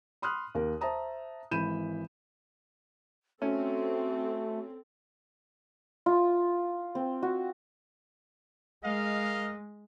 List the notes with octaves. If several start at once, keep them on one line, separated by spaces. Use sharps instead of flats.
B5 C6 D#6 F6 F#6
D#2 A#4
C5 E5 A5 A#5 D#6
G#1 E3 B5 G6 D#7 E7
A3 C4 C#4 F#4 A4
F4
C4
F#4
G#3 A#4 D#5 F5